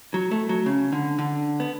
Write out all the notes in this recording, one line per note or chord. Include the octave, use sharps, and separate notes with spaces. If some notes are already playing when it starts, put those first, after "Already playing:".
F#3
A3
F#3
C#3
D3
D3
B3